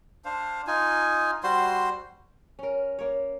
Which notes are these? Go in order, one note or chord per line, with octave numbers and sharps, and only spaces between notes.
D4 C5 F5
D#4 F4 G#5
G3 F#4 C5 C6
C#4 A#4
A#3 C#5